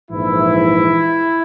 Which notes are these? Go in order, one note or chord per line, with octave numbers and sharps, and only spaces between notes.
A#1 G#2 E3 E4